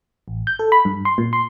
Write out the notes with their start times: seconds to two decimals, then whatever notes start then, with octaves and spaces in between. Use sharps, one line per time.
0.28 A1
0.47 G6
0.59 A4
0.72 B5
0.85 G2
1.05 C6
1.18 A#2
1.33 C6